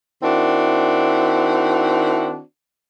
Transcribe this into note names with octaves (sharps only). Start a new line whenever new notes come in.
D#3 C4 D4 E4 F#4